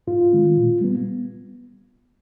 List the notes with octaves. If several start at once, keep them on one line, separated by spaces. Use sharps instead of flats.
G#2 F4
D#3 G#3 C4
A#2
G3 B3